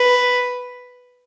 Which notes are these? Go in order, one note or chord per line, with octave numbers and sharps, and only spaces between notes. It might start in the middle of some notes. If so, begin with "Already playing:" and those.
Already playing: B4